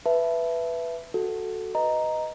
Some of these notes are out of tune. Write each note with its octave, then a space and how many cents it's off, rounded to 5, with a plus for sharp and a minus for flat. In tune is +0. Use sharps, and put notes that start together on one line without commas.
B4 +0 E5 +15 A5 -5
F#4 +0 A4 +0
B4 -5 D#5 +0 A#5 +0